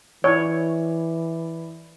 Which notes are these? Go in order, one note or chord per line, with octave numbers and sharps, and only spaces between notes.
E3 E4 C#5 D5